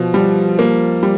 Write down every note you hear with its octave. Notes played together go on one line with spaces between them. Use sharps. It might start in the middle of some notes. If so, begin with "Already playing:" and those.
Already playing: B2 F3
G3
A#3
G3